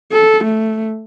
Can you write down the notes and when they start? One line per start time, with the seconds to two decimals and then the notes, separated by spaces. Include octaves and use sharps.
0.12 A4
0.44 A3